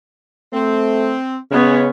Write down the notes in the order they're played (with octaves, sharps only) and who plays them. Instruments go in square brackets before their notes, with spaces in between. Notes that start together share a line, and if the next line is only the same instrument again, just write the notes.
[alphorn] A3 [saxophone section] C4
[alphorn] C#3 [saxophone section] G#3 C#4 [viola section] B3 C#5